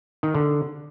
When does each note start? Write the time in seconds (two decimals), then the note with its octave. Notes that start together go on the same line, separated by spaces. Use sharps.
0.23 D#3
0.35 D3